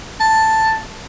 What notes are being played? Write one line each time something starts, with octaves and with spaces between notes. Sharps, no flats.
A5